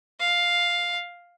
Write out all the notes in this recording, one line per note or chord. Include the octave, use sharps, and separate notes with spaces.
F5